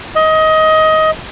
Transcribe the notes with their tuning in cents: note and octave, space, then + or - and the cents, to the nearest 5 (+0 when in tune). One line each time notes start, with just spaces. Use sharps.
D#5 +20